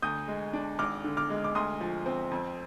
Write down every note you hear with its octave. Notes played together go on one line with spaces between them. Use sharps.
D2 D#6 G6
G#3
D4
G#1 D6 F6
D3
D6 F6
G#3
D6
D2 C6 D#6
F3
C4
F2